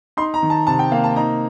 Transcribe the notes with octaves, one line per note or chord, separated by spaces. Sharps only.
D#4 C6
A#5
D#3
A5
C3 A5
G5
A#3 F5
A5
D#4 A#5